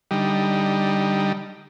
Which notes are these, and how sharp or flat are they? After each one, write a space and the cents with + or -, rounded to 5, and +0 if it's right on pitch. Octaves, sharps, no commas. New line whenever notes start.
D3 +0 G3 +0 D#4 +0